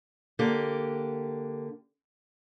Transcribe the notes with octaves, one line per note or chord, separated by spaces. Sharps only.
D3 A#3 G4